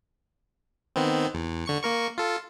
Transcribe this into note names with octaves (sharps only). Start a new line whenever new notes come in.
D#3 B3 C4
E2
D3 C#6 C#7
A#3 A#4 C#6
F4 A4